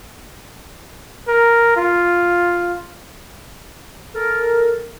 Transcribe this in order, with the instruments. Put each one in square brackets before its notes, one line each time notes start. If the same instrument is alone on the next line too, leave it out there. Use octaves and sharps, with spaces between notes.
[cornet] A#4
F4
[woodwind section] A4 A#4